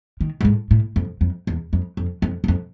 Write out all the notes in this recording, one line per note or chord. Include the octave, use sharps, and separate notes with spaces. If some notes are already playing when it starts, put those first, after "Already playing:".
D#3
G#2
A2
A2
F2
F2
E2
F2
F2
F2
E2
F2